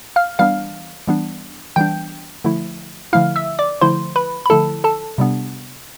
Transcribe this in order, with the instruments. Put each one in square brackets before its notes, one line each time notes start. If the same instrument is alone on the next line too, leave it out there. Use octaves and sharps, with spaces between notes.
[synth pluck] F5 F6
E3 G3 B3 D4 F5 F6
E3 G3 B3 D4
E3 G3 B3 D4 G5 G6
D3 F3 A3 E4
D3 F3 A3 E4 F5 F6
E5 E6
D5 D6
D3 F3 A3 E4 C5 C6
B4 B5
B5
D3 F3 A3 E4 A4 A5
A4 A5
C3 G3 B3 D4